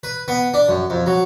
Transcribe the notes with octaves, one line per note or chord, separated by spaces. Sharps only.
B4
B3
D4
F#2
F2
F#3